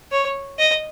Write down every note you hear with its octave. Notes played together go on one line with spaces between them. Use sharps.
C#5
D#5